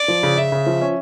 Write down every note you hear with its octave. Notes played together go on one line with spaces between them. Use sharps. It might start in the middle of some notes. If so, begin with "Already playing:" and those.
Already playing: D5
F3
C#3
C#3 E5
C#3
F3
C#4